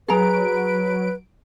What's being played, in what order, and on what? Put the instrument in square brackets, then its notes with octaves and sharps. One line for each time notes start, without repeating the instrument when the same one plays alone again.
[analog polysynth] F#3 D7 [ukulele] G#4 A#5 [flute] B4